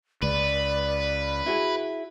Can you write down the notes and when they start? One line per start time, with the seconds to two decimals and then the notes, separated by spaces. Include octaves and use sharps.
0.22 C#2 B4 D5
1.46 E4 F#4 G#4